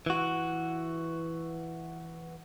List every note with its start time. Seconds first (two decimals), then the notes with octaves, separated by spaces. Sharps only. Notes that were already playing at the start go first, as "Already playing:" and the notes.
0.06 E3 F#4